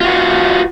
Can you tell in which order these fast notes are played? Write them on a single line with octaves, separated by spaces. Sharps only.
F4 F#4 B4